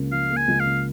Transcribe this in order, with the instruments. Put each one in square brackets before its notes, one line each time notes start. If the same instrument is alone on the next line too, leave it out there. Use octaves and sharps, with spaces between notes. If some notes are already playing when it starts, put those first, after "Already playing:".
Already playing: [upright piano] C#2 C#3 A#3
[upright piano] F3 [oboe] F5
[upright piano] A#3
[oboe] G#5
[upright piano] C#2
[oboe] F5
[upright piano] C#3